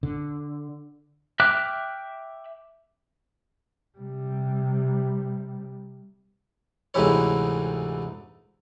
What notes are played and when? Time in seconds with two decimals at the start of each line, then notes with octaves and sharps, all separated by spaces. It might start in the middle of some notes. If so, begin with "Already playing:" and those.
0.03 D3
1.40 E5 G5 D6 F6 F#6
3.98 C3 G3
6.94 D2 G#2 C3 E3 E4 C#5